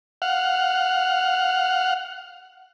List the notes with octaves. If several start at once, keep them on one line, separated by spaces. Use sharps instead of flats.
F5 F#5